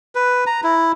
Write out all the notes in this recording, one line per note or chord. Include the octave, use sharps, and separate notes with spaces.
B4
A#5
E4